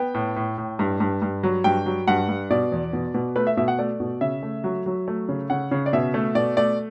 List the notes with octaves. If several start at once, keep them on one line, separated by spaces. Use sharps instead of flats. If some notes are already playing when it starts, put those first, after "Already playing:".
Already playing: B3 G5
A2
A2
A2
G2
G2
G2
F#3
G2 G5
F#3
G2 F#5
G2
B2 D5
E2
B2
B2
A3 B4
E5
B2 E5
F#5
A3 D5
B2
C#3 E5
A3
F#3
F#3
A3
C#3
C#3 F#5
C#3
D5
B2 E5
A3
B2 D5
A3 D5